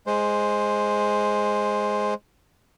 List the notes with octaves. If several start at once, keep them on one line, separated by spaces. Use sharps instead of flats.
G#3 C5